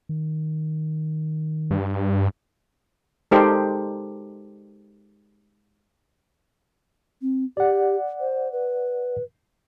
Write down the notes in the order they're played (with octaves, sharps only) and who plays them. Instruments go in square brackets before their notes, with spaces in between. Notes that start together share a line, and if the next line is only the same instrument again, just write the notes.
[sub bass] D#3
[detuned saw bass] G2
[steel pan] G#3 D#4 G4 A4 A#4 C5
[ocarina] C4
[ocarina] G4 [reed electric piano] D5 F#5
[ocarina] C5
B4